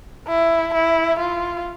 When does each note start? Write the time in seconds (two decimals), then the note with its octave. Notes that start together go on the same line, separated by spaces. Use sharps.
0.28 E4
0.74 E4
1.19 F4